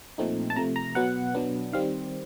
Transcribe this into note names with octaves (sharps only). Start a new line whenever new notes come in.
A#2 F3 A3 C4 D#4
A5
C3 F3 A3 A#5
A#5
B2 F#3 B3 F#5
B2 F#3 B3 D4
D#3 G3 C4 F5